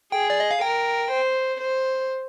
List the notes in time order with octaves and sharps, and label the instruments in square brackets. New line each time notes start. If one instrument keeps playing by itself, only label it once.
[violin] G#4 [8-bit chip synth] G5
[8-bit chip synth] D5
D#5
F5
[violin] A#4 [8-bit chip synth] G5
[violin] C5
C5